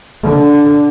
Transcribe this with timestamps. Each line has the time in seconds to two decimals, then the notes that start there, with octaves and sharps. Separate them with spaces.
0.22 D3